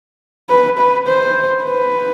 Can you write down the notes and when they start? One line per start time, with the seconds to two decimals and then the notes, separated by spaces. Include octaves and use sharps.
0.49 B4
0.78 B4
1.07 C5
1.64 B4